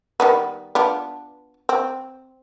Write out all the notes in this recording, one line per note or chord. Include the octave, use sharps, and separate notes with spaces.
D#3 G3 B3
B3 D4 F4
C4